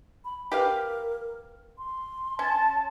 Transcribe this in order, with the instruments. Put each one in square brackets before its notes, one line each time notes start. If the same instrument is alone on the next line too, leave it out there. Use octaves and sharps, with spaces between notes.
[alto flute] B5
[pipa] G4 B4 F5 [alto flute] A#4
[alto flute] C6
[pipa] C#4 [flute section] A5